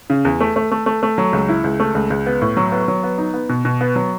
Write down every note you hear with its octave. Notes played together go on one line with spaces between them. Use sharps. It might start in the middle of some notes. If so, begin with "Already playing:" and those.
C#3
E2
A3
A3
A3
A3
A3
F#3
C#2
E4
C#2
A3
C#2
C#2
B3
A2
F#3
B3
F#3
B3
D#4
B3
B2
B2
B3
F#3